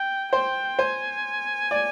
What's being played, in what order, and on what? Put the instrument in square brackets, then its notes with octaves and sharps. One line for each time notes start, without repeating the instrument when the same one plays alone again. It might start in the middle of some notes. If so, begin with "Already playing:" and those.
Already playing: [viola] G5
[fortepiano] C5 [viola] G5
[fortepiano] C5 [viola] G#5
[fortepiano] D5